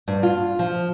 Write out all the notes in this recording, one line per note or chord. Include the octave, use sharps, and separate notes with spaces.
G2
F4
F3